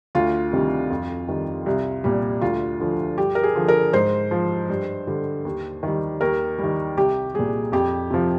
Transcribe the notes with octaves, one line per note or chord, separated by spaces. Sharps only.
D2 F4
C3 D#3 G3
F2
D#3 G3
C2
A#2 G3
D2 F4
D3 F3
G2 G4
A#4
G#4
D3 F3
A#4
G#2 C5
F3
G2
D3 G3
D#2
D#3 G3
D#2 A#4
D#3 G3
C2 G4
A#2 G3 G#4
F2 G4
C3 F3